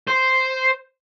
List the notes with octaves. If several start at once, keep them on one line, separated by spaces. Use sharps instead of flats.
C5